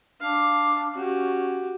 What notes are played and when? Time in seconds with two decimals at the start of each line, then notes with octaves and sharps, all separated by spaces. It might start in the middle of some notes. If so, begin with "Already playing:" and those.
0.20 D4 F5
0.94 C#4 F#4 G4